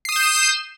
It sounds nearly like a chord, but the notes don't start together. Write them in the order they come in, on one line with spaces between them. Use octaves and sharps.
C7 D#6 E7 G6